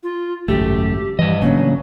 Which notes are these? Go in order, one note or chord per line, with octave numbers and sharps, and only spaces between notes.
F4
G#1 C#2 F#2 A3 G4
G2 E3 D#5
A1 C#3 F#3 A#3 D4